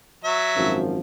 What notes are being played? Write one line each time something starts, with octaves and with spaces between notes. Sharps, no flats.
F#3 E5
G#1 F#2 F3